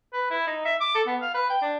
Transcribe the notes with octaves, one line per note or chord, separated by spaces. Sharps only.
B4
E4
D#4
E5
D6
A4
B3
F5
B4
G5
D4